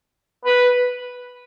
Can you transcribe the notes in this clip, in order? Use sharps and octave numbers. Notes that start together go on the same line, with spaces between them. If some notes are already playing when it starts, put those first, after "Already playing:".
B4